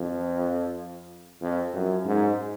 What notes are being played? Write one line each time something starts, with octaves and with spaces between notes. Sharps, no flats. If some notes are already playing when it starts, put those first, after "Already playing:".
Already playing: F2
F2
F#2
G#2